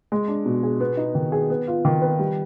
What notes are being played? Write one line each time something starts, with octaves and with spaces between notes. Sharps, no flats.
G#3
D4
B2
G#4
B3
D#4
D#3
G#4
B3
F4
D#3
B4
G3